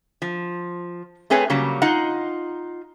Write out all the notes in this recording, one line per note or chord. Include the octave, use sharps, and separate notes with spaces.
F3
A3 C4 G#4 B4 C#5
C#3 F#3 G3 A#3
D#4 F4 D#5 F#5